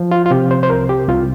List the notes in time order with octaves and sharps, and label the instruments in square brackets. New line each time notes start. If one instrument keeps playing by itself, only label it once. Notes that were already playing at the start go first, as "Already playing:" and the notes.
Already playing: [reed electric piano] F3
F4
F4
C3 G4
C5
C5
C2 A#4
G4
C2 F4